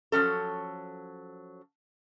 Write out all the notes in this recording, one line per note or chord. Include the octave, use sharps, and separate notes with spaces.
F3 F#3 C#4 A4